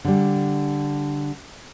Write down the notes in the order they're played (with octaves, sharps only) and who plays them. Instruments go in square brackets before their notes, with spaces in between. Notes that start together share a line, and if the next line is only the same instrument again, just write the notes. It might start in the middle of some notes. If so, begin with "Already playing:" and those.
[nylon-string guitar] D3 G3